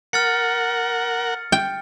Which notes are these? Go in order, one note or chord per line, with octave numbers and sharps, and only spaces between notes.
A#4 F#5 F6 A6 C#7
G5